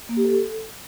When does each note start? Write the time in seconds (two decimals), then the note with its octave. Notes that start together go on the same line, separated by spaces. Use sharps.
0.09 A#3
0.17 G4
0.25 A4